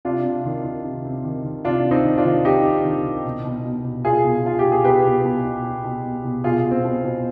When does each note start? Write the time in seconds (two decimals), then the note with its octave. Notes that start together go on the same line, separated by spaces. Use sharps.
0.05 C3 D4 F4
0.25 C3
0.45 D#3
0.65 D#3
0.85 C3
1.05 C3
1.24 D#3
1.45 D#3
1.65 C3 D4 F4
1.85 C3
1.91 C4 D#4
2.05 D#3
2.18 D4 F4
2.25 D#3
2.45 C3 D#4 G4
2.64 C3
2.84 D#3
3.05 D#3
3.25 B2
3.44 B2
3.65 B2
3.85 B2
4.04 B2 F4 G#4
4.24 B2
4.45 B2 F4
4.59 G4
4.65 B2
4.72 G#4
4.84 B2 G4 B4
5.04 B2
5.24 B2
5.45 B2
5.65 B2
5.84 B2
6.04 B2
6.24 B2
6.44 B2 F4 G#4
6.64 B2
6.71 C4
6.84 B2
7.05 B2